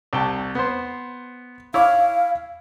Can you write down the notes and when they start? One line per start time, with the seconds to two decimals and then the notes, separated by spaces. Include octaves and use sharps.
0.13 C2 G5 A5
0.55 B3 C5
1.74 E4 C#5 F5 D6